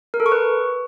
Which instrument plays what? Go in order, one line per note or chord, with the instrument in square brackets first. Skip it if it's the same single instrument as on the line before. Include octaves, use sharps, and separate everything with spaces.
[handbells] A#4
A4
C#6
B4